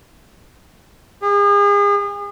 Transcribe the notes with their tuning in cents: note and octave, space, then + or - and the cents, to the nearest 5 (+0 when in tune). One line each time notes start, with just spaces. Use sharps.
G#4 -40